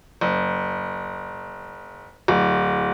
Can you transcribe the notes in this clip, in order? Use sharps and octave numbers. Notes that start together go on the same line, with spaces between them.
F#1
D1